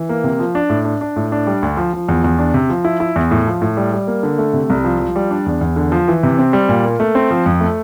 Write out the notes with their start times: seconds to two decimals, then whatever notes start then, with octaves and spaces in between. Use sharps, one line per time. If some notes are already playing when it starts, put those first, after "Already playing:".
Already playing: E3
0.09 A#3
0.24 C3
0.40 F3
0.55 D4
0.70 A2
0.85 D4
1.01 D4
1.16 A2
1.32 D4
1.47 G3
1.62 D2
1.77 F3
1.93 F3
2.08 E2
2.24 E2
2.38 D4
2.54 C3
2.70 F3
2.85 E4
3.00 E4
3.16 E2
3.31 A2
3.47 F3
3.62 A2
3.77 G3
3.93 G3
4.07 A#3
4.23 D3
4.39 A3
4.53 C3
4.70 C2
4.84 F3
5.00 F3
5.16 G3
5.31 D4
5.46 E2
5.61 E2
5.76 D3
5.92 F3
6.08 E3
6.23 C3
6.39 C4
6.53 G3
6.69 A#2
6.85 A#3
7.00 A3
7.15 C4
7.31 F3
7.46 F2
7.61 A3